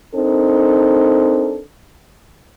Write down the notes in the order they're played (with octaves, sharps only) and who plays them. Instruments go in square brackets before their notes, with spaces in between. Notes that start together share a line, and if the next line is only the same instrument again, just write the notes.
[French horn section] C4 D4 D#4 A4 A#4